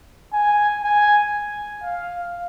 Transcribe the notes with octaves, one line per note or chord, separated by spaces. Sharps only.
G#5
G#5
F5